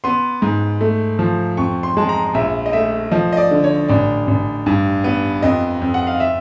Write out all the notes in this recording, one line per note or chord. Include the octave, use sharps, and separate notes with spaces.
B3 C6
G#2
A3
F3
F2 C#6
C6
G#3 A5
A#5
A#1 E5
D#5
A3 E5
F3 D#5
D#5
D5
D3
C#5
A1 D5
A1
G2
B3
F2 D#5
F2
F#5
F5
E5